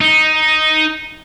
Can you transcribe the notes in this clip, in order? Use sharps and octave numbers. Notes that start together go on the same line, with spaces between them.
D#4